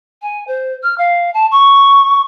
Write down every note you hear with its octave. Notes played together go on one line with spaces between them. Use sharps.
G#5
C5
F6
F5
A5
C#6